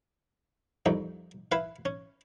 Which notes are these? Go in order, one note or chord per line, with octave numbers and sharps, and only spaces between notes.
C2 F2 D#4
E4 B4 F5
C#4